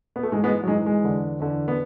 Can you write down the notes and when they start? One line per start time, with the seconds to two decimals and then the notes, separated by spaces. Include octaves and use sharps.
0.16 B3
0.23 A3
0.32 G#2 E3 G#3
0.44 G#3 B3
0.63 F#3
0.68 G#2 E3 G#3
0.86 G#3
1.04 E2 D3
1.40 E2 D3
1.68 B3